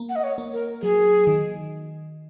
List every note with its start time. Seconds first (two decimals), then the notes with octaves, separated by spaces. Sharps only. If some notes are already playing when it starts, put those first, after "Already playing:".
Already playing: A#3
0.09 F#5
0.16 D#5
0.24 C#5
0.38 A#3
0.53 A#4
0.82 F#3 G#4
1.27 D#3